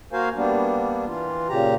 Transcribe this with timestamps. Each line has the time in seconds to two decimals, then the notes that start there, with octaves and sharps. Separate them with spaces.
0.12 A#3 F#4 A#4 C5 F5 G#5
0.36 G3 A#3 B3 D4
1.07 E3 F4
1.49 A#2 C#3 G4 A#5